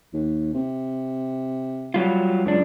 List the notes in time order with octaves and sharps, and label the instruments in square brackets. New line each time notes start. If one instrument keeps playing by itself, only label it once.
[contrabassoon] D#2
C3
[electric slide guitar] F#3 G3 F4
[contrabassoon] C#2 [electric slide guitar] F#2 D4